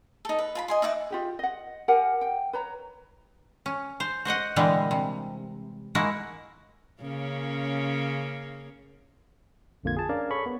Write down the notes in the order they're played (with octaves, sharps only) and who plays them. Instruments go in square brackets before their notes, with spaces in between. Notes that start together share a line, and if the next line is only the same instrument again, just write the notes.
[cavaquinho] D#4 A4
B4
F4 A5 B5
D#5 G#5 C6
D#4 E5 F#5 D6
[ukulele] F4 G4 G#4
D#5 F#5
G4 A#4 F#5 G#5
G5
B4 C#5 A#5
[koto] C#4
C5
F#4 C5 D#5 F#5
A#2 D3 E3 G3 G#3 B3
C3
G#3 A#3 E4 F#4
[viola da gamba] C#3 A#3 C#4
[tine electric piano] A#1 F2 D3 A#3 F4 G#6
G#4 A5
C#4 D4 A#4 D5 F5
G#4 A4 C#5 B5 C#6
B3